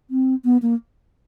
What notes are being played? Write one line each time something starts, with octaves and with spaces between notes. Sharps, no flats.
C4
B3
A#3